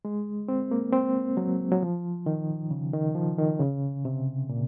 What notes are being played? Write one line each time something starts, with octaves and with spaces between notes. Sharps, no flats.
G#3
C4
A#3
C4
F#3
F#3
F3
D#3
C#3
D#3
F3
D#3
C#3
C3
A#2